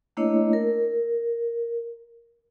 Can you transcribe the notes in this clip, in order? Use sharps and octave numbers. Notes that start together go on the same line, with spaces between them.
A3 A#3 D4 E4 C#5 D#5
A#4